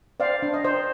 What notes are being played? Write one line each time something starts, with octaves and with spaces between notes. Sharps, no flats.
C5 D5 F5
D4
D#5
C5